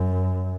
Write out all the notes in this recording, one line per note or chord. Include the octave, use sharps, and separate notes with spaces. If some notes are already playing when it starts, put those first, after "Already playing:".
Already playing: F#2